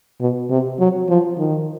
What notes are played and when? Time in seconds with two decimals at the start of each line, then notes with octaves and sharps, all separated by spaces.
0.21 B2
0.50 C3
0.80 F#3
1.09 F3
1.38 D#3